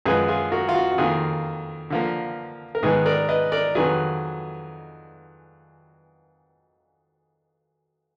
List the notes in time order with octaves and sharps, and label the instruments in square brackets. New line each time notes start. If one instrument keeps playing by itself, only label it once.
[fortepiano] F#2 F3 G#3 G#4 B4
F4 G#4
F#4 A#4
F4
F#4
F#4
F2 D#3 A#3 F4 G#4
D3 F3 A#3
A#4
G#2 D#3 G#3 B3 D#4 G#4 B4
A#4 D5
B4 D#5
A#4 D5
F2 D#3 F#3 G#4 B4